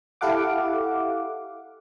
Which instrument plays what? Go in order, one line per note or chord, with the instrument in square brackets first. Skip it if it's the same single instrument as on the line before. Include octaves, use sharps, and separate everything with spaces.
[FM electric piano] E4 G4 A4 F5 F#5 D6